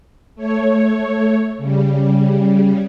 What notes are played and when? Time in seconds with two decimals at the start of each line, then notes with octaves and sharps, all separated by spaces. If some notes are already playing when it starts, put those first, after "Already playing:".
0.35 A3 C#5
1.57 C#3 G3